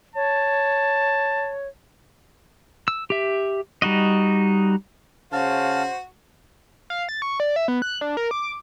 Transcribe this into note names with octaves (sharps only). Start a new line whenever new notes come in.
C#5 A5
E6
G4 E5
G3 D#4 F#4 D#5
C#3 F#4 C5 F5 A5
F5
A6
C#6
D5
E5
B3
F#6
D4
A#4
D6